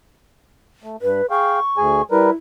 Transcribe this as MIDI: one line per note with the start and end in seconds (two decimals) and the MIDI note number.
0.83 0.96 57
1.02 1.21 43
1.02 1.26 71
1.31 1.60 68
1.31 1.60 77
1.31 1.60 79
1.31 2.03 85
1.77 2.02 38
1.77 2.02 68
1.77 2.02 80
2.11 2.30 55
2.11 2.33 64
2.11 2.30 70
2.11 2.30 71